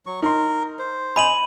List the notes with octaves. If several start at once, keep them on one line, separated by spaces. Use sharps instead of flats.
F#3 C#6
D#4 A#4 C6
C5
D#5 G#5 B5 D#7 F#7